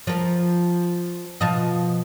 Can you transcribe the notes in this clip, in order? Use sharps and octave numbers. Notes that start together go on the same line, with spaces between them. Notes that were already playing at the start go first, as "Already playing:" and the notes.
F3 A#4
B2 F3 D#5